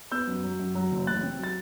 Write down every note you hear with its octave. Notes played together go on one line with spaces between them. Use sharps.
B3 E6 G6
F#2
F#3
F#2
F#3
F#1
A1 F#6 A6
C4
F#3 A6